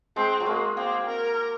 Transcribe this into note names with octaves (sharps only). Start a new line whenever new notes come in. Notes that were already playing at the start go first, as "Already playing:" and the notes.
G#3 C4
F#3
G#3 A#3
A#3 C4
A#4